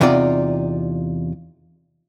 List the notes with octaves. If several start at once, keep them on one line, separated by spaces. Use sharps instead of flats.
E2 C3 D#4 F4 D5